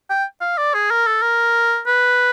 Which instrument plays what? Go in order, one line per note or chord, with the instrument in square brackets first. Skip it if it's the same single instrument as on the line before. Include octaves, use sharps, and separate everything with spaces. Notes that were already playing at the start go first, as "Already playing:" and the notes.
[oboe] G5
F5
D5
G#4
A#4
A4
A#4
B4